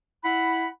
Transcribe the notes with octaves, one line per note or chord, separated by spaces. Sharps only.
E4 F#5 B5